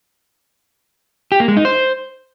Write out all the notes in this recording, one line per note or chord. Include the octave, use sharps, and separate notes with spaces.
G4
A#3
G#3
D#4
C5